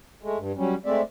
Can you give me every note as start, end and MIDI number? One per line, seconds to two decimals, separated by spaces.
0.23 0.38 56
0.23 0.38 57
0.38 0.52 43
0.57 0.75 54
0.57 0.75 55
0.57 0.75 61
0.86 1.02 56
0.86 1.02 57
0.86 1.02 60
0.86 1.02 74
0.86 1.02 76